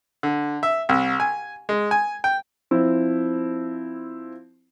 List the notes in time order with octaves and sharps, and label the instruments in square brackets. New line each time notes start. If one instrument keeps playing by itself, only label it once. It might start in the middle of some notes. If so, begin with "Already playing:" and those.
[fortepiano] D3
E5
C2
G#5
G#3
G#5
G5
[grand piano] F3 C4 E4